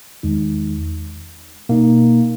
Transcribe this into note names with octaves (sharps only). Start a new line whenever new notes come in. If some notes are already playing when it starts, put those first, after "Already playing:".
E2 D#3 G#3 D#4
B2 A#3 D#4